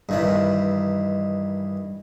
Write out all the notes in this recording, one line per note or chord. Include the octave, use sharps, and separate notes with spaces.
G2 D#3 E3